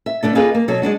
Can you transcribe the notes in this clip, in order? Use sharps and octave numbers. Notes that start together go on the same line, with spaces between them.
E5
D3 A3 D4 A4
A#3 D#4 F4 G#4 A4 B4
A#3
B2 F#3 A4
G#3 A3 D4 F#4